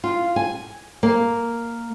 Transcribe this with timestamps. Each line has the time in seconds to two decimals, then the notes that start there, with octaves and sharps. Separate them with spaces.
0.04 F4
0.36 G#5
1.03 A#3